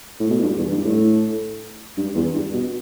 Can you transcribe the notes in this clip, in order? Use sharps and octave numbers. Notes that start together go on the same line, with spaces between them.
A2
B2
G2
E2
G2
A2
G2
E2
G2
B2